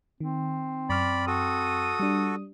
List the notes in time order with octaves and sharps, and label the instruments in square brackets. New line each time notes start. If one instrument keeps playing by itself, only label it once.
[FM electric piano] D#3 [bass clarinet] C4
[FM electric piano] F#2 C#6 F6 [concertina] D5 B5
[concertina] F#4 A4 [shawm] D#6
[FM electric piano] G3 D4